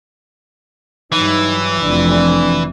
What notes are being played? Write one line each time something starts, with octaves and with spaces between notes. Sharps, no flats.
G2 E3 F#3 D#4
F1 F2 D4 D5